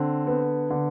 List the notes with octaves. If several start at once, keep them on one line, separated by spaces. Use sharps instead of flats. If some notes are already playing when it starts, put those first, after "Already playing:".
Already playing: D3 C4
B3
D3